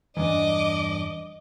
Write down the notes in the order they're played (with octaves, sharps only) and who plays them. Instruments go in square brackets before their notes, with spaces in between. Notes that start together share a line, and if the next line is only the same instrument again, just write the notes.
[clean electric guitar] E2 G2 D4 [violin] D#5 D6